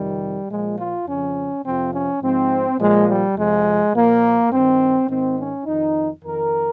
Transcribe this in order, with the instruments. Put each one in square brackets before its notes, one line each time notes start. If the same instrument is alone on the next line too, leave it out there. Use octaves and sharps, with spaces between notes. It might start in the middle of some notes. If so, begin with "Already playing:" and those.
Already playing: [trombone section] F2 C3 D#3 G3
A#2 F3 G#3
F4
F2 C#3 F3 C#4
F2 C3 F3 C4
C#4
G#2 F3 C4
A#2 F3 G#3
G3
F2 C3 F3 G#3
A#2 F3 A#3
G2 D#3 C4
G#2 D#3 C4
C#4
F2 D#3 D#4
F2 D#3 A#4